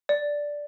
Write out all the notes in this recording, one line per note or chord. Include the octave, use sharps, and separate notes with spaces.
D5